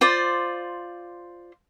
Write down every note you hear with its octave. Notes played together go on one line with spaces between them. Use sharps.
F4 C5 D5